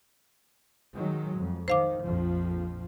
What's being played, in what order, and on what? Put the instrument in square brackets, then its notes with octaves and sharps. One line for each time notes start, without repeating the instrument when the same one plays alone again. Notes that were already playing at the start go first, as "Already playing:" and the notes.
[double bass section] D#3 F#3 G#3
F2
[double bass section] D#3 [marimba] C5 F5 D6
[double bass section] A#1 F2 F3